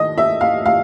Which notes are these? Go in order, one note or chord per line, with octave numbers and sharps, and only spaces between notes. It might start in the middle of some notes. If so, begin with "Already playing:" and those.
Already playing: D#2 A3 D#5
E5
F5
F5